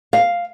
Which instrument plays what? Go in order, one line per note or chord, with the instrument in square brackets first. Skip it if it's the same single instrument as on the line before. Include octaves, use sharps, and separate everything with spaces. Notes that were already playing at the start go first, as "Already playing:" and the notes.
[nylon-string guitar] F5